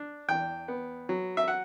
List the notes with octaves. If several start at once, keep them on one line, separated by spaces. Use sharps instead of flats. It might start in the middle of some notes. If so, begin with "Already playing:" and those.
Already playing: D4
E2 G5
B3
F#3
E5
F#5